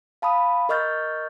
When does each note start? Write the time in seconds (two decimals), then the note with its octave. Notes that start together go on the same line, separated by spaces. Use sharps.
0.22 F5 A5 B5 D#6
0.69 A#4 D#5 C#6 F6 G6 A6